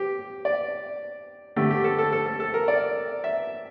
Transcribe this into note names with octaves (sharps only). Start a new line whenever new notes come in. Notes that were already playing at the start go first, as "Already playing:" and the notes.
Already playing: G4
D5
D3 A3 G4
G4
A4
A4
A4
A4
A4
A#4
D5
E5